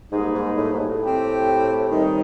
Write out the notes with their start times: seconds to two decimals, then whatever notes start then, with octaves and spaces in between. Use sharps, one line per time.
0.12 G#2 G3 A#3 D#4 G#4 B4
0.34 G#2
0.57 A2
0.73 G#2
0.79 A2
1.01 C4 E4 G4
1.91 D#3 G3 C4 D#4